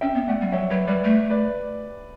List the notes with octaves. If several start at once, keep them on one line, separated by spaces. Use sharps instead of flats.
C#4 E5 G5
B3
A3 D5 F#5
G3
F#3 C#5 E5
F#3 B4
G3 B4 D5
A3
B4 D5